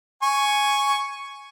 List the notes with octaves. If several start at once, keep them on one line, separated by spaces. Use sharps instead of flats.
G#5 C#6